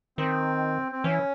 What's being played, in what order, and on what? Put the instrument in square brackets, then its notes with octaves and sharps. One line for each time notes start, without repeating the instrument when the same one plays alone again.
[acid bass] D#3 [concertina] C4
[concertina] C4
[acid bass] E3 [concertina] C#4